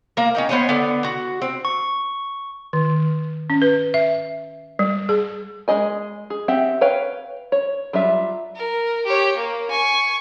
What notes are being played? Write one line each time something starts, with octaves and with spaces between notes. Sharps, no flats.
A#3 A#4
C#4 D#4 G5
B3 C5 C#5 D#5
D3 B3
F#4
C4
C#6
D#3
C#4
B4
E5
G3
G#4
G#3 E4 G#4 D#5 G#5
G#4
C4 G4 E5 F#5
B4 C#5 F5 G5
C#5
F#3 G3 F4 E5
A#4
G4 C#5
A#3
G#5 C#6